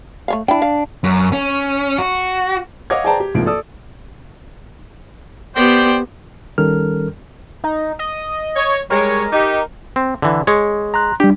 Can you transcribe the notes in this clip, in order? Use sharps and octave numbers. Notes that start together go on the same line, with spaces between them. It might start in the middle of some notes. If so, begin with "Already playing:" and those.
A3 C#5 F5
D4 E4 G5
F5
F#2
C#4
F#4
C#5 D#5 F5 F#5 D6 G#6
G#4 C5 D5 G5 A5 A#5
G4
C2 G#2 F3 A#3 D7
A4 D5 D#6 E6
B3 G4 C5 D5 G5
D#3 G3 C#4 A4 A#4 F6
D#4
D#5
C#5
G3 G#3 A#4 C#5
D#4 G4
C4
D3 E3
G#3 C#5
A#5 C6 F#6
G3 D4 G4